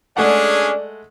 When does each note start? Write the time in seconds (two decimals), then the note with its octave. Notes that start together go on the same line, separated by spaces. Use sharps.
0.17 G#3 A3 C#4 D4 G#4 D5 F#5